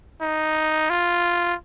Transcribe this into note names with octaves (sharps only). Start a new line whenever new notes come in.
D#4
F4